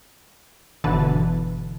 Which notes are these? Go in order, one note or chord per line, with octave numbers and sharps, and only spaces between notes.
G1 B2 D3 E3 B4 A5